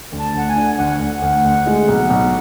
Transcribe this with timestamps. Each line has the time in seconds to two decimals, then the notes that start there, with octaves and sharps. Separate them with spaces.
0.12 D2
0.20 A5
0.34 D2 F#5
0.49 G#5
0.56 D3
0.78 D2 F#5
1.00 D2
1.22 D2
1.45 D2
1.66 G#3
1.88 B1
2.10 B1